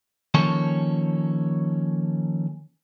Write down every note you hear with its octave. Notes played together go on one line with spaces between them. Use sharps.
D#3 F3 A#3 C#4 A4 C#5